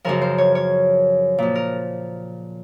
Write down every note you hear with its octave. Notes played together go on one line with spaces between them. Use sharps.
F#2 C#3 F3 A#4
C5
C#5
C#5
A#2 F3
A#4